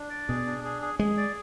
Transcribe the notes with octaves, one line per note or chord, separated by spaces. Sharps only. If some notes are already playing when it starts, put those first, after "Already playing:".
Already playing: D4
D5
B2 G#4
D4
G#4
G#4
G#3 G#4
D5